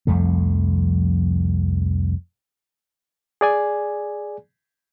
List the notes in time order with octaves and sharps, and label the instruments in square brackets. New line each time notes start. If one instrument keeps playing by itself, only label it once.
[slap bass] C2 F2 F3 A3
[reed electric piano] G#4 D5 G#5